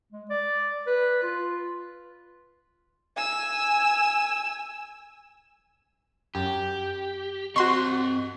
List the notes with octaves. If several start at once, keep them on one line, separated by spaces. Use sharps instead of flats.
G#3
D5
B4
F4
G#5 E6
F#2 G4
C4 F#4 D#5 C6 C#6